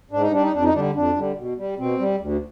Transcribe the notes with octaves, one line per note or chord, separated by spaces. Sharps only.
G#2 D4
D#4
G3 D4
D#4
F2 D4
D#4
D3 G3 D4
F2 D4
D3 G3
B2
G3
B2 C4
G3
D2